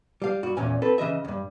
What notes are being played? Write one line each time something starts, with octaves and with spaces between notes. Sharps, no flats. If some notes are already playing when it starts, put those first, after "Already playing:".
G3 F5
G2 F#4
E2 A#2 C#4 G#5
C4 A4 B4
C#3 E3 D#5 E5
E2 G2